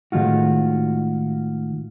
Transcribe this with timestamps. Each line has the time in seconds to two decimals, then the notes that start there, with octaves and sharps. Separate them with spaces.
0.12 A2 D#3 G#3 F4 F#4